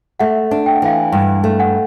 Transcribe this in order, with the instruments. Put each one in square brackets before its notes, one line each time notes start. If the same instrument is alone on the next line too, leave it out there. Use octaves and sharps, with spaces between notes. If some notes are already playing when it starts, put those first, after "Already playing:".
[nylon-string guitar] A3 [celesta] E5 F#5
[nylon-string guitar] D4
[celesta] G5
F#5
[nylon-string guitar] E3 [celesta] F5 G5
[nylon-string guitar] G2 [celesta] F5 G5
[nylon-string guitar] A3
[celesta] F#5 G#5